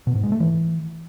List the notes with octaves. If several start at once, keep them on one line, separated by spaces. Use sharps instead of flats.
B2
G#2
G#3
A3
E3